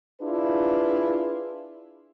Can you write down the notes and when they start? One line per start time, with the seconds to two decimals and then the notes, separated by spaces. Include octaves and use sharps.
0.21 D4 E4 F4 G#4 B4